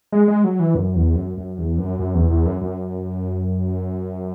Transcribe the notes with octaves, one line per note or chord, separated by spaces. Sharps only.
G#3
G#3
F#3
E3
F#2
E2
F#2
F#2
E2
F#2
F#2
E2
E2
F#2
F#2